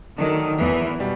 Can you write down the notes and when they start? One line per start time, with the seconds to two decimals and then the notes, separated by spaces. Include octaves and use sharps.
0.18 D#3 F#3 A3 D4
0.59 E2 E3
1.00 B2 G3